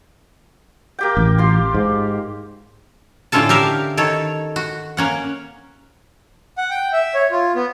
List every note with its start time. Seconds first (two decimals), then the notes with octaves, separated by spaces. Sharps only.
0.99 A#3 G4 G5
1.17 A1
1.38 F4 G4 C6
1.74 G#2
3.32 A2 D3 C#4 F4 A4 A5
3.49 G4 A#4 E5 F5
3.97 D#3 A4 C#5
4.56 F#4
4.97 A#3 C#4 F#5
6.58 F#5
6.70 G5
6.93 E5
7.14 C#5
7.31 F4
7.55 B3